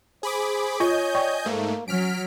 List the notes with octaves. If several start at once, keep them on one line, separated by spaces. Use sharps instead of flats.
G#4 C5 B5 D6
F4 C#5 D#5 G#5 G6
D5 G5 C#6
G#2 A3 A#3
F#3 C#4 F6 B6 D7